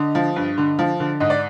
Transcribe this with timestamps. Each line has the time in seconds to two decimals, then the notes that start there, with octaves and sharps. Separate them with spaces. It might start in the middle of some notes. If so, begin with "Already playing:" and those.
Already playing: D3 D#5
0.15 F3
0.36 G2
0.58 D3
0.79 F3
1.00 D3
1.20 G#2 D#5
1.30 D5